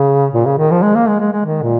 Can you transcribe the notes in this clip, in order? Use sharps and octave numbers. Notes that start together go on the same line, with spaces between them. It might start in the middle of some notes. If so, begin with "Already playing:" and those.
Already playing: C#3
A#2
C#3
D#3
F3
G#3
A#3
G#3
G#3
G#3
D#3
A#2